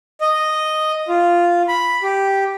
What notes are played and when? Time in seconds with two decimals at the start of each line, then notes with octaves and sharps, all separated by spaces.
0.21 D#5
1.08 F4
1.68 B5
2.03 G4